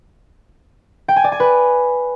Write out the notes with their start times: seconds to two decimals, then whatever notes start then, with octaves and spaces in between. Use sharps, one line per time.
1.08 G5
1.16 G#5
1.24 D5
1.32 G#5
1.40 B4